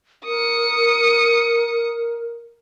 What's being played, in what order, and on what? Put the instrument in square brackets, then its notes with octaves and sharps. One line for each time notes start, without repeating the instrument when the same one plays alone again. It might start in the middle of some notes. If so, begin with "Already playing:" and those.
[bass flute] A#4 [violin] D#6 C#7